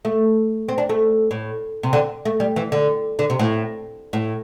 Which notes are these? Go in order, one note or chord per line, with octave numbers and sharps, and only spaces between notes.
A3
C4
D4
A3
A2
C3
D3
A3
G3
E3
D3
D3
C3
A2
A2